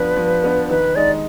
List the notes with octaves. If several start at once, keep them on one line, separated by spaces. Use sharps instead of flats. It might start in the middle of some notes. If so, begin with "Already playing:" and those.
Already playing: F3 B3 D4 B4
F3
B3 D4
D#3 B4
G#3 D#4 D5